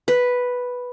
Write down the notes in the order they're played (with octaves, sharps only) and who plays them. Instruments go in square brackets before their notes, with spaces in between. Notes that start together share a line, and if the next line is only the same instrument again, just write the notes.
[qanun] B4